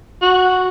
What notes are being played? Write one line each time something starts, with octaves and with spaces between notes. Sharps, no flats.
F#4